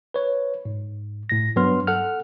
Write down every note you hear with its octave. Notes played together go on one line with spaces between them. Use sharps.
B4 C#5
G#2
A2 A#6
G2 F#3 B3 B4 C6 F6
A4 F#5 F6